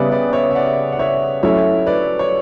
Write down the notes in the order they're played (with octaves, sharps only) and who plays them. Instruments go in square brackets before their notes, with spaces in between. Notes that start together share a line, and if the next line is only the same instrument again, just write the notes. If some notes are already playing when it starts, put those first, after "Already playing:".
Already playing: [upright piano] C#3 G3 B3 [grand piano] B4 D5 E5
[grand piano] B4 D5
C#5 E5
E5
D5 F#5
F#5
C#5 E5
[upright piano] F#3 A3 C#4 E4 [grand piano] C#5 E5
[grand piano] B4 D5
C#5